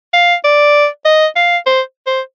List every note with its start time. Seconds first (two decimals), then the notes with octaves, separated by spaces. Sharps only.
0.13 F5
0.44 D5
1.05 D#5
1.36 F5
1.66 C5
2.06 C5